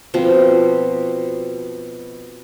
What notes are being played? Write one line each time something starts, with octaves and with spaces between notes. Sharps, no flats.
B2 F3 C4